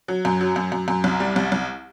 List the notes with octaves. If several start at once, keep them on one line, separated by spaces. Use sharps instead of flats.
F#3
F#2
F#3
F#2
F#2
F#2
C2
G3
C2
C2